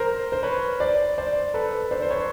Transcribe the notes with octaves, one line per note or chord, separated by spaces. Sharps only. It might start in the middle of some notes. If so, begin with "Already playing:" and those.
Already playing: A#4 C5
C5
B4 C#5
C5 D5
C5 D5
A4 B4
C5 D5
C5
B4 C#5